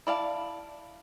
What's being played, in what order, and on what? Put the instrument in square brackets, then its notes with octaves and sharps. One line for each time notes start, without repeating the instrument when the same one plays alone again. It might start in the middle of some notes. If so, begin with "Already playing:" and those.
[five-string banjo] E4 D5 F5 A5